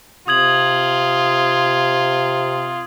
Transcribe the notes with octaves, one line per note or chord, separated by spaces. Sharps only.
C3 F4 D#6 G#6 F#7